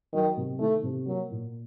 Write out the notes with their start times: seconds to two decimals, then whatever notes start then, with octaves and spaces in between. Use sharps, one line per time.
0.14 D#3 F#3
0.37 C3
0.60 D#3 A3
0.83 C3
1.06 F#3 A#3
1.31 A#2